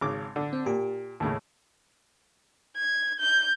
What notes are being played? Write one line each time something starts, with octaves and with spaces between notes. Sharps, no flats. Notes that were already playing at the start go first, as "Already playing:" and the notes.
G#1 C#3 D6
D3
C4
A#2 G4
D#2 A2 C#3
G#6
G6